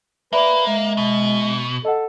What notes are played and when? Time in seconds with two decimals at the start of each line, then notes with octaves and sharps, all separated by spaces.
0.33 A#3 B4 D5 E5
0.67 G#3 E5
0.97 B2
1.85 A4 D#5 F#5